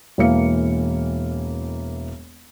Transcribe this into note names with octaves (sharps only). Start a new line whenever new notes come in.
E1 E3 A#3 F5 C#7